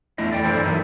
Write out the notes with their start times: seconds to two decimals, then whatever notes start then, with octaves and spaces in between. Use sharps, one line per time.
0.18 E2 A3 D4 E4 D#5
0.31 A4 D5 G5
0.44 G2 E3 E4 A4 C5 D5
0.64 F#3 A3 A#3 D#4 E4